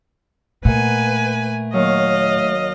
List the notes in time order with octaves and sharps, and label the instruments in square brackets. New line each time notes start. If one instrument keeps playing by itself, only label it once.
[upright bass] A#2 [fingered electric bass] A3 [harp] A#4 F5 F#5 [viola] B4 G#5
[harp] D#2 F#3 [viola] D#5 F5